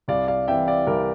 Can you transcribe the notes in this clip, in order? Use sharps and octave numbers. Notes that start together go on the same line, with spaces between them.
C2 D5 F5
D5 F5
C3 E3 E5 G5
D5 F5
C2 A#4 D5